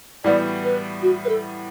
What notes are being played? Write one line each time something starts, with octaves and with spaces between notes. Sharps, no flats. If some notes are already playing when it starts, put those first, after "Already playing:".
A2 E3 G3 B3 F#4 D5
B4
F#4
B4
A4